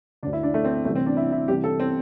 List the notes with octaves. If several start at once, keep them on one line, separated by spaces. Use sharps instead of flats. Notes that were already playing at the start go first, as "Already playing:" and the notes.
D2 D3 D4
E4
D4
A3
C4
C2 C3 E3 A3
C4
D4
E4
E4
C2 C3 E3 G4
A4
C4